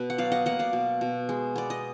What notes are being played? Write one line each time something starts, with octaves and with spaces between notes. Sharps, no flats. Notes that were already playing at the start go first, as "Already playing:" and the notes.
Already playing: B2 B4
F#5
F#3 D5 F5
D#5 F#5
A#3 D#5 F#5
D5 F5
B2
B2
G#3
B3 D5
D#5